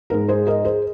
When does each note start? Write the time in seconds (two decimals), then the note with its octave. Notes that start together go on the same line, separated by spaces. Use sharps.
0.10 G#2 G#3 A#4
0.29 G#4 C5
0.47 A#4 D#5
0.65 G#4 C5